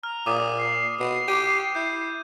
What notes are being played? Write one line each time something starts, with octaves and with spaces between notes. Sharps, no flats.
A#5 F6
A#2 D6 D#6 D#7
C7
B2 C7
G4 D6 D#7
E4 G6